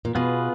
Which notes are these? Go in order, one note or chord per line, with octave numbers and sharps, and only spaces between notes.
A#2
B2 B3 F4 G#4 B4